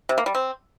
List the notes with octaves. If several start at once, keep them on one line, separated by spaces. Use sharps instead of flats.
C3
A#3
G3
C4